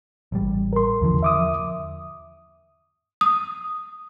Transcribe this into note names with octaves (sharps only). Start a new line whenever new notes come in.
A1 G3
A#4 C6
E2 D3 F3
E5 D6 D#6
D#6